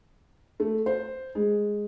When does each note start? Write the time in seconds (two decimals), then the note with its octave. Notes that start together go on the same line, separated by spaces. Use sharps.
0.60 A3
0.86 C5
1.35 G#3